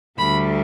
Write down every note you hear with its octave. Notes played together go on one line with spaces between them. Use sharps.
D2 D3 G3 B5